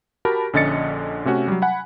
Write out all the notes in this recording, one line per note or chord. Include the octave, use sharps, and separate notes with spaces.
F#4 G4 A#4 A5 B5
A#1 D3 C#4 D#5 A6 C#7
C3 A3 C#4 F#4
F#3 G3
F#5 G#5 B5